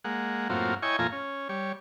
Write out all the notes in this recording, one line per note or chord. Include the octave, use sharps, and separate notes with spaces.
G#3 A#3 F#5
F#2 A2 A#3 C4 F4 F#4
E4 C#5 D#5 G5 G#5 C#6
F2 A#2 A3 F4 G#5 A#5
C#4
G3 C#5